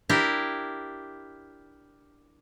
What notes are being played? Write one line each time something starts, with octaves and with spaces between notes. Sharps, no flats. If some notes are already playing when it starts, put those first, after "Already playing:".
D4 E4 G4 A#4